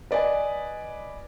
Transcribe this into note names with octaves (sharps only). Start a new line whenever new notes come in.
B4 D5 D#5 G#5